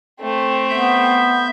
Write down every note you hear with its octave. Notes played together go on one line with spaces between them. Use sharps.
A3 C4
B3 E5 G6